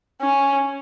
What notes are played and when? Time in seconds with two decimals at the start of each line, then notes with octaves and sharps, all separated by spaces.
0.21 C#4